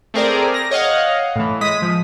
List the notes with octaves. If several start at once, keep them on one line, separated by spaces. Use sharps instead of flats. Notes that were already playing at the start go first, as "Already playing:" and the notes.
A3 C4 G#4 A#4 C5 D5
A#6
C#5 D#5 F5 F#5
A2 E3
G#3 D#6 B6
F3